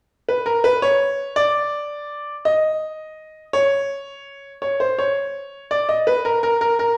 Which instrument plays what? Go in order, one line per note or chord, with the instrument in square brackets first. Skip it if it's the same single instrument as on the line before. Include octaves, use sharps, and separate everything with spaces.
[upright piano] B4
A#4
B4
C#5
D5
D#5
C#5
C#5
C5
C#5
D5
D#5
B4
A#4
A#4
A#4
A#4